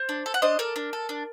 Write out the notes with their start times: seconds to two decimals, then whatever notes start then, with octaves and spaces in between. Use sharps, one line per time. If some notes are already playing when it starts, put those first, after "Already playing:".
Already playing: C5
0.09 D4
0.26 A4
0.34 F#5
0.42 D4 C5 D#5
0.59 A4 A#4 D5
0.76 D4
0.93 A4
1.09 D4